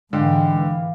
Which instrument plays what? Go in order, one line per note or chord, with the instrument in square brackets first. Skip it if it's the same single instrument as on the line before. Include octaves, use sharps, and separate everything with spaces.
[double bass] G#2 E3 [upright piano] D3 [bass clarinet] G#3 [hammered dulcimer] F5 G5 D6